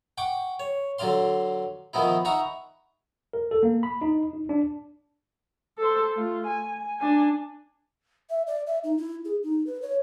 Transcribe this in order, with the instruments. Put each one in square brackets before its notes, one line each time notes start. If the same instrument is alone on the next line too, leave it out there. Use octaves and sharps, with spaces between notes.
[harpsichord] F#5 G5 C#6 D6
C#5
D3 F#3 D4 D5 F5 C6
D#3 F3 B3 D#4 E4
D#4 E5 F#5 A#5 B5 C#6
[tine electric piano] A#4
A4
A#3
B5
D#4
D#4
D4
[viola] A4 C5
A3 F4
G#5
D4 G#5
[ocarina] E5
D5
E5
D#4
E4
G#4
D#4
B4
C#5